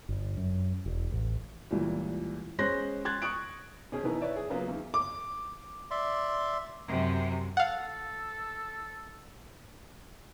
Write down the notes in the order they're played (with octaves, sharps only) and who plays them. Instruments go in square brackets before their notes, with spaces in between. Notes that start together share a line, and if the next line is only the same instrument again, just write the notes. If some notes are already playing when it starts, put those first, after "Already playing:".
[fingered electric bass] G1
F#2
E1
A1
[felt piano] C#2 A#2 E3 G3
G#3 C#4 C5 C6 F#6 A#6
C6 F#6 G#6 A6
C#6 D#6 F#6 D7
[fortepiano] B2 C#4 G#4
B2 D#3 E3 B3 E4 A#4
B4 C#5 D5 E5
G#4
C#3 F#3 A#3 B3 F4
E2 D#3
[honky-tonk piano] D6
[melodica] D5 E5 C6
[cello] F#2 C3
[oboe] A4 [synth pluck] F5 F#5